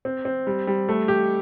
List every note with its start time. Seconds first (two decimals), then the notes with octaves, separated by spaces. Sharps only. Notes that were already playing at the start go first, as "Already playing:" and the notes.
0.05 C4
0.25 C4
0.47 G3
0.67 G3
0.89 A3
1.08 G4